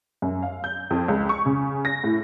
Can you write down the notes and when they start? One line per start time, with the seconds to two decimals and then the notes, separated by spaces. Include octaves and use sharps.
0.22 F#2
0.42 F5
0.64 G6
0.91 F2
1.08 C#2
1.29 C#6
1.46 C#3
1.85 A#6
2.04 A2